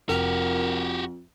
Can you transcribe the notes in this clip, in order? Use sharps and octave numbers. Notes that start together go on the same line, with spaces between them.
F1 F2 F#4 G4 A#4